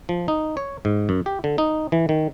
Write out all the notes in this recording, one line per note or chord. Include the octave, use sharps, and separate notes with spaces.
F3
D#4
C#5
G#2
F#2
G4
D3
D#4
E3
D#3